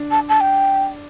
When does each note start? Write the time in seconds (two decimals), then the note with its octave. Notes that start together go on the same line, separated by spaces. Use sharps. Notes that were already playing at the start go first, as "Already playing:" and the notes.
Already playing: D4
0.11 A5
0.29 A5
0.41 G5